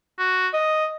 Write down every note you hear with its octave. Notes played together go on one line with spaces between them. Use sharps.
F#4
D#5